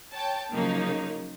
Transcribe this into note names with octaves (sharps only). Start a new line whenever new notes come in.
C#5 G5 A5
C#3 F3 F#3 A#3 D#4